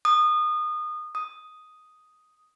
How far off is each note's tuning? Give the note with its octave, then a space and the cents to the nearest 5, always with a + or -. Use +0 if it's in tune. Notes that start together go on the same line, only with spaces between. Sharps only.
D#6 -25
D#6 +5